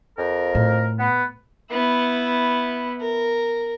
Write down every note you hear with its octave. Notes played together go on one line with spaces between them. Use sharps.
F2 A#4
A2
B3
B3 E4
A#4